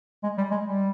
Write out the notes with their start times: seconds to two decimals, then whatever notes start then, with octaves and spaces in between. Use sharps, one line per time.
0.23 G#3
0.38 G3
0.51 G#3
0.65 G3